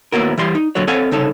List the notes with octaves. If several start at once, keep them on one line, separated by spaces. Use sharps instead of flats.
D#2 A2 A#3 B3 F#4 A#4
E3 G3 C6
D#4
A#2 D3 F#3 F#4 C#5
C4 A4 C#5 F5 F#5 G#5
C2 C#3 D#4 A4 C#5